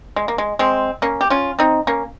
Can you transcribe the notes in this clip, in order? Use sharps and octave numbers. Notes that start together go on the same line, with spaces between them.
G#3
A#3
G#3
G#3 C4
A#3 C#4
G4
C#4 F4
C4 D#4
A#3 C#4